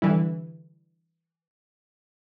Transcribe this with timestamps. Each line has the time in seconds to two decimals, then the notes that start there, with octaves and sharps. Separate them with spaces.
0.02 D3 E3 G3 E4